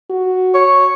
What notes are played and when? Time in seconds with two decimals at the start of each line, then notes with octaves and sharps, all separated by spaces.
0.10 F#4
0.54 C#5